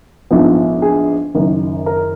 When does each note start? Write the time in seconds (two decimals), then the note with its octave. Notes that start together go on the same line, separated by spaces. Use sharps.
0.31 A#1 G#2 F3 B3
0.82 G#4
1.35 F#1 F#2 D#3
1.86 A#4